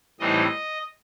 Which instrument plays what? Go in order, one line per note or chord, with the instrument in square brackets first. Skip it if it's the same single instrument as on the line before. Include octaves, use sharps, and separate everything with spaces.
[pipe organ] A2 E3 G3 C4 D#4 D#5